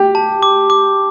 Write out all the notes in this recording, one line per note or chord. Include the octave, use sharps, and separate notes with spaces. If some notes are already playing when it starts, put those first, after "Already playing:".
Already playing: G4
A5
D6
D6